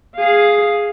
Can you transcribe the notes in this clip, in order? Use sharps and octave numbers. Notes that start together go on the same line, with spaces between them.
G#4 F5